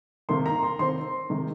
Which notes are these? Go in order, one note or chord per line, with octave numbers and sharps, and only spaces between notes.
C3 D#3 A#3 C6
A#5
C6
D#3 C4 C6
C3 D#3 G#3